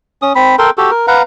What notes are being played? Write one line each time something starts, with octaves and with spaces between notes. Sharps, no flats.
C#4 D#6
C4 B5
A4 A#4 G5 C6
F#4 G4 A4
A#4
B4 F5 F#5 A#5